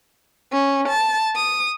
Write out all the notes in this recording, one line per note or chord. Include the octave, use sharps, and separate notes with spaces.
C#4
A5
D#6